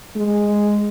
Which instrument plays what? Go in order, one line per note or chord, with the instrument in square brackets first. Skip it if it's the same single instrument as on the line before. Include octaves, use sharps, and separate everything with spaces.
[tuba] G#3